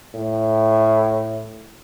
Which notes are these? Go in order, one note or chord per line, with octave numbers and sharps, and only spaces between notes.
A2